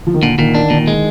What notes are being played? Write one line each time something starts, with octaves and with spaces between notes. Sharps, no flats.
F3
D#3
A#2 D3
A#2 D#3
D#3 D4
A#2 D#3
G#3